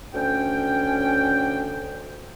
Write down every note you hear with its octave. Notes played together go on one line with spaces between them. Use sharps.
D2 C#4 G5